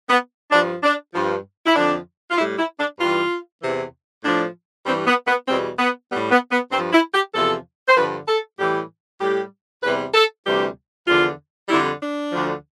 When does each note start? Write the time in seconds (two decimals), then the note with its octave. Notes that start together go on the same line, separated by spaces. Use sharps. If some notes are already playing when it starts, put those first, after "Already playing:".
0.10 B3
0.51 G2 F3 D4
0.83 D4
1.14 G2 F3
1.66 E4
1.75 F2 D3 F3 D4
2.30 F4
2.37 A2 G3 E4
2.58 E4
2.79 D4
2.99 G2 E3 G3 F4
3.62 E2 C3 E3
4.24 A2 F3 D4
4.86 G2 E3 G3 C4
5.07 B3
5.27 B3
5.48 E2 B2 G3 C4
5.79 B3
6.10 A2 G3 B3
6.31 B3
6.52 B3
6.72 G2 C4
6.75 F3
6.93 E4
7.13 G4
7.34 E2 C3 F3 A4
7.88 C5
7.96 G2 D3 F3 B4
8.28 A4
8.59 A2 E3 G3 G4
9.21 A2 G3 G4
9.83 E2 C3 G3 B4
10.14 A4
10.45 D2 C3 E3 G3 G4
11.07 E2 D3 F3 F4
11.69 F2 D3 G3 E4
12.00 D4
12.31 D2 D3 F3